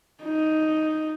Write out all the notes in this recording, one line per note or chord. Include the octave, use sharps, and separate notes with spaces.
D#4